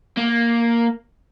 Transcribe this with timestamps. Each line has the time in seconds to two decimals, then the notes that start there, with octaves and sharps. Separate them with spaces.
0.17 A#3